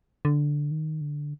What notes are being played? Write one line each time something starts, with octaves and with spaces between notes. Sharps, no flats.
D3
D#3
D3